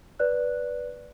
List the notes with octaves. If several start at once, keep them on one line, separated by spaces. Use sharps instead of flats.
B4 D5 F#6